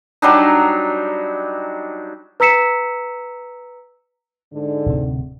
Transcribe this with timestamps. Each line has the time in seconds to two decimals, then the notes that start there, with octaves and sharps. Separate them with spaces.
0.22 F#3 G3 D4 D#4
2.40 B4 A#5 E6 B6 C#7 E7
4.53 G#2 D3
4.86 D1 C3 C4